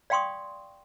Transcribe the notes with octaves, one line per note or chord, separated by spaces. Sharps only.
D5 F5 G5 C6 C#6 D#6